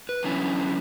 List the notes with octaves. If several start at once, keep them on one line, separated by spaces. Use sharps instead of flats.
B4
E2 D3 F#3 C#4 E4